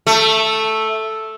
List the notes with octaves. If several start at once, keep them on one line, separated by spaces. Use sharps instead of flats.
A3